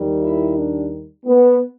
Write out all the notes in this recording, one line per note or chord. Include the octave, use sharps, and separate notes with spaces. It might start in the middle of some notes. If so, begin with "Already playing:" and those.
Already playing: D#2 D#3 G3
E4
D4
B3